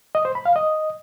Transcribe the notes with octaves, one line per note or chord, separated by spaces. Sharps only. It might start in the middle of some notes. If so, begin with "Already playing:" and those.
D#5
C5
B5
F5
D#5